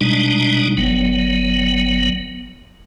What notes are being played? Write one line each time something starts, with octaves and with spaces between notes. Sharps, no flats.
B2 G3 G#3 D4 D#4
G1 F#3 B3